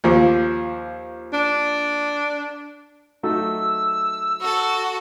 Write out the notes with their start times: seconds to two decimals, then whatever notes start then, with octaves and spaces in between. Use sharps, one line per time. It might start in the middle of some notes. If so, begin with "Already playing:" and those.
0.04 D#2 F3
1.33 D4
3.23 F#3 A3 D#4 E6
4.41 F#4 A4